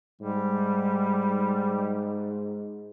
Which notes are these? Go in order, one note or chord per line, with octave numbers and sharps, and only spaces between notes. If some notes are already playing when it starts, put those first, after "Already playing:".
G#2 G3